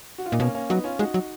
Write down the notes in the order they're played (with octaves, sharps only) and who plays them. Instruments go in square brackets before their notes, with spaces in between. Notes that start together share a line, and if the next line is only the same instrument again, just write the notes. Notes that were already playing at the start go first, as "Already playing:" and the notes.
[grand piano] F#4
F4
[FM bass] A#2 [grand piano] D#4
[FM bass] B2 [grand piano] A#3 C#4
[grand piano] A#3 C#4
[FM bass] F#3 [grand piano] B3 D#4
[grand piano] C#4 F4
[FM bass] G#3 [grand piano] D#4 F#4
[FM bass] F#3